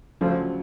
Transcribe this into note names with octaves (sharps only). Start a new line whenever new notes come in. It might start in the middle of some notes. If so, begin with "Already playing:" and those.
D2 C#3 F3 F#3 A3 D4